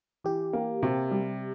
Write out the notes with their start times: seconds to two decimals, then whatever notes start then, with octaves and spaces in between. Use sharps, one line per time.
0.24 E3 G4
0.53 A#3
0.83 C3
1.11 G3